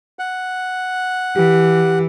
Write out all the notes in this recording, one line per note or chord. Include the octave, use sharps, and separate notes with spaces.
F#5
E3 G4